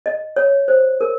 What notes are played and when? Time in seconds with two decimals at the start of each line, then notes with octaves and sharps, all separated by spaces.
0.06 D#5
0.36 C#5
0.68 C5
1.01 A#4